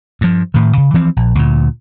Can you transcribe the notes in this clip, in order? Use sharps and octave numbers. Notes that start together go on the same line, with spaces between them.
G2 F3
A2 D#3
C#3
E3 F3 C4
A#1
D2 A#2